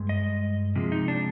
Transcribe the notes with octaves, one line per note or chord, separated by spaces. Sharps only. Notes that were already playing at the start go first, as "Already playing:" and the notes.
Already playing: G2 G#3
D#5
C3 F3 G#3
D#4
D4